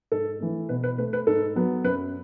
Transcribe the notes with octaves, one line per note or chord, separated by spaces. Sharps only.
G#2 A4
E3 A3
B2 B4
B4
A3 B4
B4
G#2 A4
F#3 B3
F#2 B4